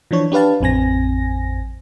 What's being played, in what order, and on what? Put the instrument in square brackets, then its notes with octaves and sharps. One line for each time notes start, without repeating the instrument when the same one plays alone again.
[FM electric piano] E3 F3 D4 C#5
D4 G4 B4 F5 A5
A1 F2 C4 G#5 A#6